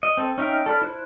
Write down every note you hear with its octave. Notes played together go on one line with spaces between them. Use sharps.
D#5
C4 A4
C#4 D#4 E5 F5 G5
A4 D5 B5 F6
E4 C5 F#6